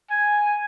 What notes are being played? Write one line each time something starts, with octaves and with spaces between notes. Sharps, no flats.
G#5